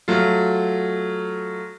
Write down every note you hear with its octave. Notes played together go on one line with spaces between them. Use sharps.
F#3 A3 F4